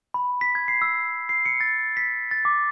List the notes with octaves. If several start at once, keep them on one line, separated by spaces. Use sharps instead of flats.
B5
B6
G#6
C7
E6
C7
C#7
A6
B6
A6
D6